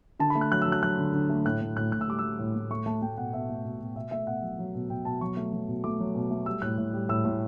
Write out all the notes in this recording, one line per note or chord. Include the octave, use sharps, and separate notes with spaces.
D3 A5
B5
A3
F#6
F#3 F#6
E6
F#3
F#6
F#3 F#6
D3
D3
A3
A2 F#6
A2
A2 F#6
A2 F#6
E6
G3 D6
G3 E6
A2
A2
A3 C#6
A3 A5
A3 G5
B2 F#5
B2 E5
A3
B2
B2
B2 E5
A3 E5
B2 F#5
F#3
F#3
B2
B2 G5
B2 A5
F#3 C#6
A3
F#3
B2
A3 D6
F#3
B2
A3
G3 E6
A2 F#6
A2
G3
A2 E6
A2